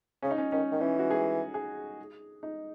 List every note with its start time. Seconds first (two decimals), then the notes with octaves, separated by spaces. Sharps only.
0.22 C#3 C#4
0.31 D#4
0.38 C#4
0.52 D#3 C#4
0.72 D#3
0.81 E3 C#4
0.99 F#4
1.11 G#4
1.54 G#4
2.43 D#4